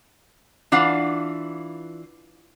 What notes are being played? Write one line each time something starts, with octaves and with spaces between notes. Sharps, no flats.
E3 D4 F4 F5 F#5